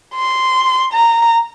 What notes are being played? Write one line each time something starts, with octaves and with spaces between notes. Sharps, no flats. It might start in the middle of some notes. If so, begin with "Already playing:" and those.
C6
A#5